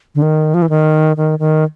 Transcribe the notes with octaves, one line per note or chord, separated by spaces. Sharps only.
D3
D#3
F3
E3
D#3
D#3
D#3